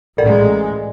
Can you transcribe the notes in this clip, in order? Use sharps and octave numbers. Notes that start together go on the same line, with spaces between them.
A1 G#3 A4 A#4 D5